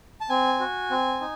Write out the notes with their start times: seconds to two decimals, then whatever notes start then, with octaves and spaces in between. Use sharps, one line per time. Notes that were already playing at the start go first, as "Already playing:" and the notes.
0.21 A5
0.29 C4 G#5
0.59 F#4
0.90 C4
1.21 D#4